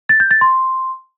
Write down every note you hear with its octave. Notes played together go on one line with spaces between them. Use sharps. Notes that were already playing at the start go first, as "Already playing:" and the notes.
A6
G6
A6
C6